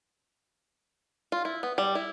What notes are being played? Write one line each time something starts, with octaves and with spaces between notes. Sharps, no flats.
F4
E4
B3
G3
E4